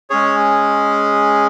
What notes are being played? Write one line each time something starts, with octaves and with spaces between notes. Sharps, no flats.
G#3 C#4 G#4 C#5